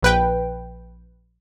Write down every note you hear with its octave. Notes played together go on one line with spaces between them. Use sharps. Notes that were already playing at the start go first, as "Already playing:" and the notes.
A#1 B4 G5